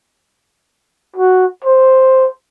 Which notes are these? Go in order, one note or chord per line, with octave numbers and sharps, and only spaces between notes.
F#4
C5